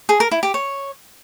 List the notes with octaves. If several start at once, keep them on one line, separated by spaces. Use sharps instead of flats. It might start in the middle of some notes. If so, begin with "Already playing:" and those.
G#4
A#4
E4
G4
C#5